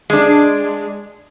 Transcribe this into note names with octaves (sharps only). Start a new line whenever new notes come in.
G#3 D4